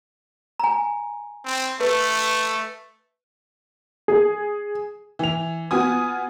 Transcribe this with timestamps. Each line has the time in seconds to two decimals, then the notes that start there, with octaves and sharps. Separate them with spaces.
0.59 G#5 A#5
1.45 C4
1.81 A3 B4
4.08 G#4
5.19 E3 F7
5.71 B3 F4 F#4 G#5 D#6